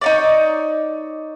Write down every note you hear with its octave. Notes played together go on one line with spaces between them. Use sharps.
D#4 C#5 D5